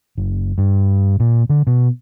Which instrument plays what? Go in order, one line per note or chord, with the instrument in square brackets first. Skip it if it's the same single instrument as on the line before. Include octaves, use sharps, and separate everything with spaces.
[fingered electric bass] F#1
G2
A#2
D3
B2